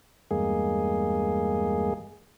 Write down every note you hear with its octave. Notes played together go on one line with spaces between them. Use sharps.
E2 G2 G#3 A#3 G#4